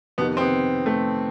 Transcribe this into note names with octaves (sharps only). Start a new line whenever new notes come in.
F2 C3 D#3 B3
C4
B3
A3